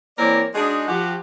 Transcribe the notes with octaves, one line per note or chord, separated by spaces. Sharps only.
E3 A#3 C4 A#4 C#5 D5
G#3 D4 D#4 F#4 G#4
F3 F#4 G4